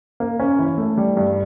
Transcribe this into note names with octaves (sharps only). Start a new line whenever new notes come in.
A#3
C#4
E3
A3
G3
G2